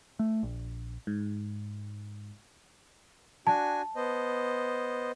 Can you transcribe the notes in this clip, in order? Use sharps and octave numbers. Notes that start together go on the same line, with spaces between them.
A3
A#1
G#2
D4 F#4 G#5 A5
B3 C5 D#5